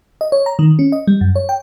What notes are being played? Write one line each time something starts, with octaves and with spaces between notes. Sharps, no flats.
D#5
C#5
A#5
D#3
C#4
D#5
G3
F#2
C#5
G5